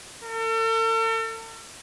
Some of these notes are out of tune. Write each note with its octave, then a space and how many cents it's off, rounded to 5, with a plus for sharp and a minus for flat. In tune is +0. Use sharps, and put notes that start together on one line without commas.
A4 +45